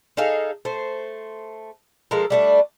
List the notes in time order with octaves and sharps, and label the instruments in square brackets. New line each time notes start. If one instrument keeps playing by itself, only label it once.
[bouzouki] D#4 G#4 A4 F5
A3 C5
F3 G#3 A4 A#4
G3 A3 D4